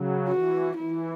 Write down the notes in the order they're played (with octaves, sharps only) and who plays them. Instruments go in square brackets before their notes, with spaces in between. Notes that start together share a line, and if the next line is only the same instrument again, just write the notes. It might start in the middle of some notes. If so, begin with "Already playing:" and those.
Already playing: [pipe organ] C#3 F#3
[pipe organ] E3 [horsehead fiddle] F#4
[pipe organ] E3 [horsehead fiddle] E4